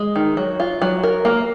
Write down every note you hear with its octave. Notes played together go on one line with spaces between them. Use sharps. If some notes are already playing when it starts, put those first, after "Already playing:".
Already playing: G#3
D#3
F#3
F4
F#3
A#4
A#3